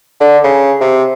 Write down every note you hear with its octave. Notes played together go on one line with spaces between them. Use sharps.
D3
C#3
C3